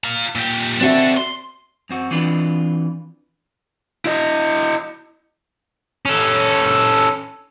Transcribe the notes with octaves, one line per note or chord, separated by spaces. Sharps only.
F4 A#5
A#2 G4
C4 D4 F#4 A4 E5
C6
F#2 C4 F#4
E3 C4 D4 F4 B4
E4 D#5
C#4 A4